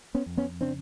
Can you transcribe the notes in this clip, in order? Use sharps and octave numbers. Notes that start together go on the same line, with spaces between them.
B3 C#4
F2
B3 C#4
C#3 C4 D4